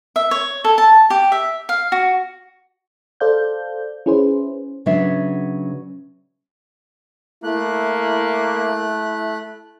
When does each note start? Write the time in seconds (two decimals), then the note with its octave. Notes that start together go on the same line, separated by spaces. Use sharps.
0.16 E5
0.31 C#5
0.64 A4
0.78 A5
1.10 G4
1.32 E5
1.69 F5
1.92 F#4
3.20 A4 C5 D5 F5 G6
4.06 C#4 E4 G#4 B4 C5
4.86 C#3 F#3 B3 C#4 D4 E5
7.44 A3 A#3 E4 F#6